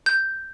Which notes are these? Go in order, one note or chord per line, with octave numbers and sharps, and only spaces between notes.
G6